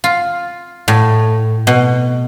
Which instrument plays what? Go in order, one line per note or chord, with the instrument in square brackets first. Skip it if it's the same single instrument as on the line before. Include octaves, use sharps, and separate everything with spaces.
[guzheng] F4
A2
B2